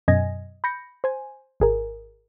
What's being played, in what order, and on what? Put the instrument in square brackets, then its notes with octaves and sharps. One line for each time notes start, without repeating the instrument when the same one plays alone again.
[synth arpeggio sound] F#2 B2 D#5 G#5 G#6 A#6
B5 G6 A#6 C#7
C5 G#5
G#1 G#4 A#4